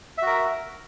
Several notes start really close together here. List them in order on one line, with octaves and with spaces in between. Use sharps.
E5 F#4 A#4